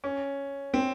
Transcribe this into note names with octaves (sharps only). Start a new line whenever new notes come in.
C#4
C4